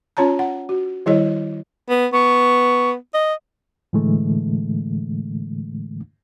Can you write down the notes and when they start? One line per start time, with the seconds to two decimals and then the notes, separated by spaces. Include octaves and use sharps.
0.17 C#4 F4 C#5 A5 A#5
0.39 F#5
0.69 F#4
1.06 D#3 G3 E4 G#4 C#5 D#5
1.89 B3
2.13 B3 C#6
3.14 D#5
3.93 A2 D3 E3 G#3 A3